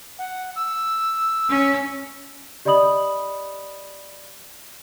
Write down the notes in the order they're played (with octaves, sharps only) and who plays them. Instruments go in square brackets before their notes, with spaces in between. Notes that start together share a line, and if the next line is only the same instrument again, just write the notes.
[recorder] F#5
E6
[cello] C#4
[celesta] G4 D5 D#5 B5 D#6 F#7